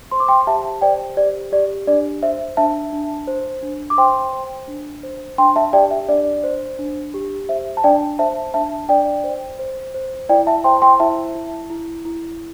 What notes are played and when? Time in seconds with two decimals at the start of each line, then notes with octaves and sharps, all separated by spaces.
0.11 C5 C6
0.20 D6
0.28 G5 C6
0.47 G4 E5 A5
0.81 C5 D5 G5
1.17 G4 D5
1.52 G4 D5
1.87 D4 D5
2.22 C5 E5
2.57 D4 E5 A5
2.93 D4
3.27 C5
3.63 D4
3.90 D6
3.98 C5 G5 C6
4.33 C5
4.68 D4
5.03 C5
5.38 D4 G5 C6
5.56 E5 A5
5.73 G4 D5 G5
5.91 E5
6.08 D4 D5
6.44 C5
6.79 D4
7.14 G4
7.49 C5 E5
7.77 A5
7.84 D4 D5 G5
8.19 C5 E5 A5
8.54 D4 E5 A5
8.89 D4 D5 G5
9.24 C5
9.59 C5
9.94 C5
10.29 E4 D5 G5
10.47 E5 A5
10.64 C5 G5 C6
10.82 G5 C6
11.00 E4 E5 A5
11.35 E4
11.70 E4
12.05 E4